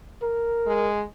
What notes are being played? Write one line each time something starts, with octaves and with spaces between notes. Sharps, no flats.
A#4
G#3